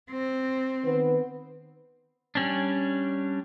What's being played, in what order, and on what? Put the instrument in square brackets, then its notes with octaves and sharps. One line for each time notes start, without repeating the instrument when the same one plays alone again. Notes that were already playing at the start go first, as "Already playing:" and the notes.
[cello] C4
[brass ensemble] D#3 B3 B4
[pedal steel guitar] G3 C#4 D4